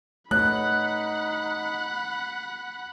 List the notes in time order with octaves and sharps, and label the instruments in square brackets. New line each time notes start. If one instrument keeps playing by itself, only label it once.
[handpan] A3 B4 C#5 [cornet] D#4 [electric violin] F#5 B5 [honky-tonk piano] F#6